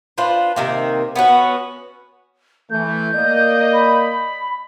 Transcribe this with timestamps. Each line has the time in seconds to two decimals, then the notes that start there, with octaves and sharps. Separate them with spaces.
0.18 D4 F4 B4 C5
0.56 C3 D#3 A#3
1.16 B3 C#4 F#4
2.70 E3 A3 G6
3.14 A#3 D5 D#5
3.73 B5